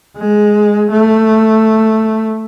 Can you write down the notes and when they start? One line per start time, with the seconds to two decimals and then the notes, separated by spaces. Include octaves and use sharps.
0.18 G#3
0.91 A3